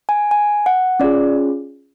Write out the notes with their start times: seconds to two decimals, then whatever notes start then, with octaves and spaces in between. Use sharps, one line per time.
0.09 G#5
0.31 G#5
0.66 F#5
1.00 C#4 F4 G#4 D5